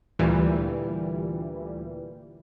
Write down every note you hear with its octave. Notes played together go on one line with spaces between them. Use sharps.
D2 A#2 E3 G3